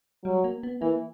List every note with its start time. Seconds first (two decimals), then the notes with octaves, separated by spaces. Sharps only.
0.25 F#3 G3
0.44 A#3
0.63 B3
0.81 E3 A#3